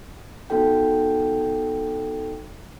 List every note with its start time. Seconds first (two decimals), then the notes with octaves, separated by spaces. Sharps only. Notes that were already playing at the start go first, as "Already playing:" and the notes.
0.50 B3 D#4 F#4 A4 G5